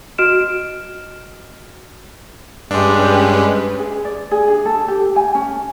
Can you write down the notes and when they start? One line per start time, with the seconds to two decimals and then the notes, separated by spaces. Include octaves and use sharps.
0.18 F#4 D#5 F6 D7 E7
2.71 G2 G#3 C#4 D4 G4 B4
3.79 G#4
4.05 D5
4.31 G#4
4.48 D4
4.65 A4
4.88 G4
5.16 G#5
5.35 C#4